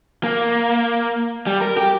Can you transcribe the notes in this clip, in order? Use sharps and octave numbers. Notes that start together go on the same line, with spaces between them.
A#3
G3
A#4
G4